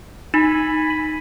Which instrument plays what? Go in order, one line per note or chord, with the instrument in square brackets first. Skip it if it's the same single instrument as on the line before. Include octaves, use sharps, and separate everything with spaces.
[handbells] D#4 [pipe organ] G#5 B5